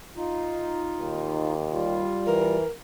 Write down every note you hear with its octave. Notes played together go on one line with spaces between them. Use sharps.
D#4 F4
D#2
G3 F4
E3 A#4